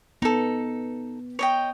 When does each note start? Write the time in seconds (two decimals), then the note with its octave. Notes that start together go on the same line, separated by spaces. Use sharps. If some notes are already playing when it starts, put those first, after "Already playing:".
0.22 B3 D#4 A4
1.39 C#5 D#5 G5